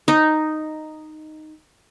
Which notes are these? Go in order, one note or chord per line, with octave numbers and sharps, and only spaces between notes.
D#4 D#5